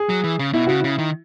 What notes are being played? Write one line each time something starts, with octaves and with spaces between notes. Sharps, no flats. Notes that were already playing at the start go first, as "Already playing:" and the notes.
Already playing: G#4
F#3
E3
C#3
B2 E4
C#3 F#4
C#3 E4
D#3